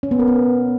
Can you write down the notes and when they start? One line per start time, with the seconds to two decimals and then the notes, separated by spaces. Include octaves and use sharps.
0.03 C#4
0.11 B3
0.19 A#4
0.28 B3